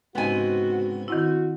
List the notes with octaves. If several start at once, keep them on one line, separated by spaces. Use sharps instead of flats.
C#2 G#2 C3 B3 F#4 G#5
D#3 C4 E4 F#4